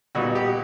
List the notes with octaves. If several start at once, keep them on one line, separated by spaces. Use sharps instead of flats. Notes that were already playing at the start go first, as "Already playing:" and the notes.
A#2 G3 B3 D#4 F#4
G4